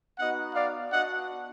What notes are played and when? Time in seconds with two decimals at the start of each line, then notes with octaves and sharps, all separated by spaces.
0.19 B3 D#4 F#4 D#5 F#5
0.55 D5 F5
0.91 B3 D4 F#4 D#5 F#5